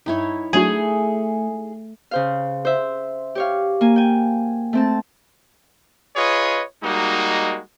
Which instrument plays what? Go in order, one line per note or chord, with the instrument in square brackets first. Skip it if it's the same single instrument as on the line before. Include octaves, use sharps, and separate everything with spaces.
[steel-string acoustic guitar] G2 [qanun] D#4 E4 C#5
[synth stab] F#3 D4 F#4 [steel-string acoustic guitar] A3 [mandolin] G#4
[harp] C#3 C5 F5
C5 E5
G4 C#5 F5
A#3 G#5
G5 G#5
A3 C4 A5
[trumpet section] F4 G#4 B4 C#5 D#5
G3 G#3 A#3 D#4 F#4